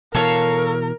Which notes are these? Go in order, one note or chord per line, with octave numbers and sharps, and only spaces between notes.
B2 E3 A4 A#4 C#5 F5